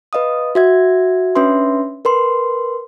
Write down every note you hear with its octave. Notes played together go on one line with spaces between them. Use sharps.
B4 D#5 F5 D#6
F#4 E5 G#6
C#4 D4 B4 E5 C6
A#4 B4 C6